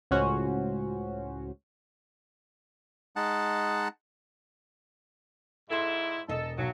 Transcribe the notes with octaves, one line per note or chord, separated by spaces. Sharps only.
C#2 A2 C#4 F#4 C5
G#3 D#4 F#5 A5
G#2 E4 A4 C6
E1 A4 D#5
B1 F#3